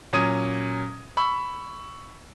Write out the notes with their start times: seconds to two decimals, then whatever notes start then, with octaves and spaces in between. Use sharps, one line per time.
0.13 A#2 F#3 C#4 D#6 G#6 D#7
1.17 B5 C#6 E6